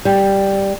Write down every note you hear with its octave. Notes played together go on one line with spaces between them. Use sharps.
G3